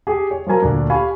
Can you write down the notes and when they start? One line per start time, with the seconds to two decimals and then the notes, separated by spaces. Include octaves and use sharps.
0.07 G4 G#4
0.31 C#5
0.47 F3 F#3 A#4 G#5 A#5
0.62 D2 A#2 D4
0.89 G4 F5 G#5 B5 C#6